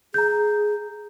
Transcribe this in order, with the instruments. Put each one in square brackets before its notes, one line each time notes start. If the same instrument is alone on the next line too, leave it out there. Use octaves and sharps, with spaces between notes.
[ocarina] G#4 [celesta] A#5 G6